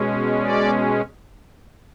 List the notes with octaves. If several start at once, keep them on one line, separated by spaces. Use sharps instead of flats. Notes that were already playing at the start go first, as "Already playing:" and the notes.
Already playing: B2 G#3 C#4
D5